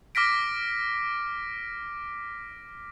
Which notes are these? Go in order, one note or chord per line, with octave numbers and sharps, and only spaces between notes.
D6 F6 A#6 B6 D7